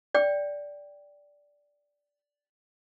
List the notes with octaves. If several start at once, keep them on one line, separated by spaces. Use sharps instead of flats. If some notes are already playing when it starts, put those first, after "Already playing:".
D5 G5